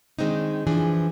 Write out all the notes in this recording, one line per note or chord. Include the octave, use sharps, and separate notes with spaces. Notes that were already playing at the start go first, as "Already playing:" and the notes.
D#3 G#3 C4 D4 D#4
E3 F3 D4 G#4